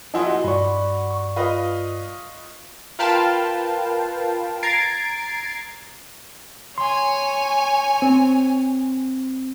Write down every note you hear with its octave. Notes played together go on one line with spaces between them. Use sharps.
F3 D#4 E4 D#5 F#5 G#5 C6
F#4
G2 D5 B5 C#6
C#6
F4 B4 D#5
F4 A#4 B4 F5 G5 A5
A#5 G#6 A6 C7 D7
C#5 G#5 C6
C4